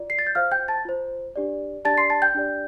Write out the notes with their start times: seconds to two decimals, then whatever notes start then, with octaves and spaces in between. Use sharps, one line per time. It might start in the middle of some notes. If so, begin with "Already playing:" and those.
Already playing: F4 D5
0.10 C7
0.19 A6
0.27 G6
0.35 F4 C5 F5 F6
0.51 G5 G6
0.68 A5 A6
0.85 F4 C5
1.36 D4 G4 D5
1.85 D4 G4 D5 A5 A6
1.98 C6 C7
2.10 A5 A6
2.22 G5 G6
2.35 D4 G4 D5